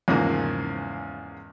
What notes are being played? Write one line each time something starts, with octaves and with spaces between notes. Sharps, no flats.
E2 G#2 C#3 F3 A#3